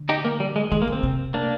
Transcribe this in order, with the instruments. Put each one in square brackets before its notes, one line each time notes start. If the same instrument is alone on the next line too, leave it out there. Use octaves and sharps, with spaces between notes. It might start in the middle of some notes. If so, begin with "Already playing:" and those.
Already playing: [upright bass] D3
[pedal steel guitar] D#4 G4
A#3
G3
G#3
[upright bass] D#3 [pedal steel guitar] G#3
[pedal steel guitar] A#3
[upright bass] D3 [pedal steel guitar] C4
[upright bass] C3
[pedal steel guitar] A#3 D4